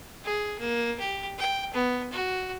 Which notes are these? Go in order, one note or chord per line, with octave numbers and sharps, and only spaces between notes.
G#4
A#3
G4
G5
B3
F#4